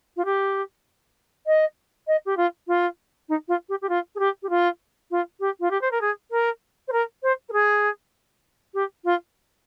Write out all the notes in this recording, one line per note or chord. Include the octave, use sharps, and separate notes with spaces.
F4
G4
D#5
D#5
G4
F4
F4
D#4
F4
G4
G4
F4
G#4
G4
G4
F4
F4
G4
F4
G4
C5
A#4
G#4
A#4
C5
A#4
C5
A#4
G#4
G4
F4